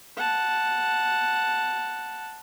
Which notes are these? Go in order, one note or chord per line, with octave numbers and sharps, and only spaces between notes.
F#5 A5